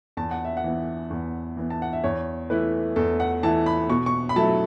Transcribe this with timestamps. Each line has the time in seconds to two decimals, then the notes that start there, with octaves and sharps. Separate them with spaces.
0.17 E2 A5
0.31 F#5
0.45 E5
0.57 F#5
0.64 E3 B3
1.10 E2
1.57 E3 B3
1.70 A5
1.82 F#5
1.93 E5
2.04 E2 C#5
2.50 E3 A3 E4 B4
2.96 E2 A4
3.20 F#5
3.43 E3 A3 E4 A5
3.66 B5
3.90 B2 C#6
4.06 C#6
4.29 B5
4.36 F#3 A3 E4 A5